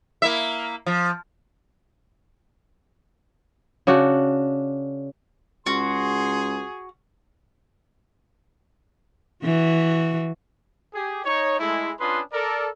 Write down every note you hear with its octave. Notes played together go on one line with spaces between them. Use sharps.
A#3 E4 E5
F3
C#3 D4 F#4
C#2 F#4 G#4 C6
E3 F#4
G4 G#4
D#4 C#5
G#3 A3 E4
C#4 D4 F4 B4 C6 D#6
A4 A#4 D5